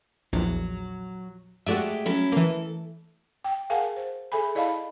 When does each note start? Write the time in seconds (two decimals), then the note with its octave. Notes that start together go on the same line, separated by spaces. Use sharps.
0.33 A#1 E2 F#3
1.66 G#3 A3 F#4 G4 D5 E5
2.06 F#3 C#4 E4
2.32 E3 A#3 A4
3.44 G5
3.70 G#4 A#4 F5 F#5 G#5 A5
3.96 C5
4.32 G#4 A4 E5 G#5 B5
4.55 E4 D5 D#5 F5 A5 B5